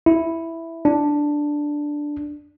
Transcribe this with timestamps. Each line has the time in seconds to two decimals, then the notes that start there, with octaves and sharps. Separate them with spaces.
0.06 E4
0.85 D4